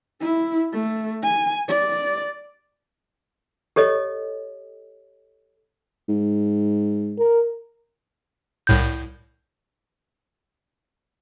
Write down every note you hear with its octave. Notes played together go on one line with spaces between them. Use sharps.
E4
A3
G#5
D5
G4 A4 C#5 D#5
G#2
A#4
C2 A2 G6